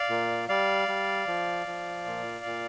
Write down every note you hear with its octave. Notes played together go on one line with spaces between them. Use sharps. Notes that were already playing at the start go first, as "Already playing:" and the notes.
Already playing: D5 F5
A#2
G3 D5 F5
G3
F3
F3
A#2
A#2